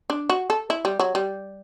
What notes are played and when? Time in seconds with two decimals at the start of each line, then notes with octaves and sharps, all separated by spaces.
0.10 D4
0.30 F#4
0.50 A4
0.70 E4
0.85 G3
1.00 F#3
1.15 G3